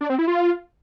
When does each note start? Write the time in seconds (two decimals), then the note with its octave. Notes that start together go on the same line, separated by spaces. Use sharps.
0.01 D4
0.10 C4
0.19 E4
0.27 F4